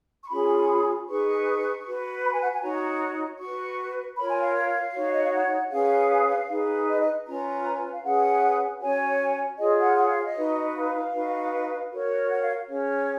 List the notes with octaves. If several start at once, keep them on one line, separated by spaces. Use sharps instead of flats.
C#6
C#4 F4 G#4 B5
D#4 G#4 B4 C#6
F#4 B4
B5
G#5
F#5
G#5
D#4 F#4 C#5 A#5
F#4 B4 C#6
F4 A#4 C#5 B5
G#5
F5
F5
D#4 F#4 C#5
D#5
F5
F#5
C#4 G#4 B4 F5
D#4 G#4 B4
D#5
D#5
C#4 F4 B4 A#5
F5
C#4 G#4 B4 F#5
C#4 F#4 C#5 G#5
F4 G#4 C#5 D#5
F#5
F#5
F5
D#5
D#4 F#4 B4
F5
D#4 F#4 B4
F#4 A#4 C#5
F#5
F5
C#4 G#4 C#5